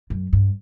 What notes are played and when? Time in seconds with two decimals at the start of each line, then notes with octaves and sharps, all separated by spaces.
0.10 F#2
0.33 G2